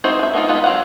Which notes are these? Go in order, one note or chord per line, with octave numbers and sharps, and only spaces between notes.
C4 D#4 E4 F#4 C5
B4 E5
A#3 B3 D#4 F4
E3 B3 D#4 F4 B4
F#3 C4 C5 F5 F#5